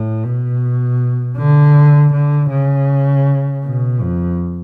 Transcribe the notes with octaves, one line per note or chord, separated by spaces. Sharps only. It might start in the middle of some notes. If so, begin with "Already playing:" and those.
Already playing: A2
B2
D3
D3
C#3
B2
F2